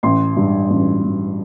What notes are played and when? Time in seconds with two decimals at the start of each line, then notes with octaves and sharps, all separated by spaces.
0.03 A1 C6
0.37 G2
0.70 A1
1.04 A1